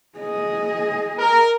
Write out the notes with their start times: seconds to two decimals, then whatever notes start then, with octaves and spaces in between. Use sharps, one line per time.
0.18 G#4 D#5
1.19 A#4